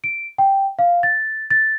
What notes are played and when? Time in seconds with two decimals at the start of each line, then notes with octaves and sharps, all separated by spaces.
0.04 D7
0.38 G5
0.79 F5
1.03 A6
1.50 A6